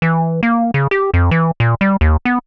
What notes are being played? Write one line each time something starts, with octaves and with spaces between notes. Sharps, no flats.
E3
A#3
C#3
G4
F2
E3
A#2
G3
D#2
B3